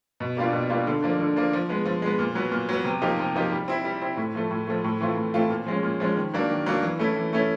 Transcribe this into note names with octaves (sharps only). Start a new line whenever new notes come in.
B2
G3 A#3 D4 F4
B2
G3 A#3 D4 F4
D3
F3 A#3 D4
D3
F3 A#3 D4
F3
G#3 B3
F3
G#3 B3
A#2
F#3 B3
A#2
F#3 B3
C3
F3 A#3 D#4 G4
C3
F3 A#3 D#4 G4
G3
C4 E4
G3
C4 E4
A2
F3 A3
A2
F3 A3
A2
E3 A3 C4 F4
A2
E3 A3 C4 F4
A#2
F3 G#3 C#4
A#2
F3 G#3 C#4
D#3
F#3 A#3 D4
D#3
F#3 A#3 D4
E3
A3 C#4 E4
E3
A3 C#4 E4